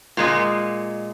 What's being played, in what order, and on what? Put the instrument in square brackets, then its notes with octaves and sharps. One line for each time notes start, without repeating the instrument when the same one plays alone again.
[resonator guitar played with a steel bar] A#2 G#3 D#5